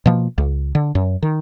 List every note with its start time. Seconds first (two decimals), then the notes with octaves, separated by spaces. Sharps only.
0.06 B2 F3 A#3
0.38 C#2
0.75 D3
0.95 F#2
1.23 D#3